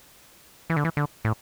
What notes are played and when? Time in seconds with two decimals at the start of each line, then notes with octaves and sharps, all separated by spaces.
0.70 E3
0.76 D3
0.85 E3
0.97 D3
1.25 A2